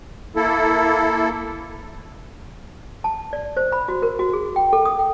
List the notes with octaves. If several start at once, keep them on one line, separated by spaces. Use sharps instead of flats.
A#3 E4 A4
A5
D5
C5
B5
F#4
A#4
F#4
G#4
G5
A4
D#6
G5